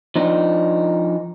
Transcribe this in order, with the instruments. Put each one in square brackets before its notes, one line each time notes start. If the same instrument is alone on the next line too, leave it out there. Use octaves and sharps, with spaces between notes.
[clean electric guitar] F3 D4 D#4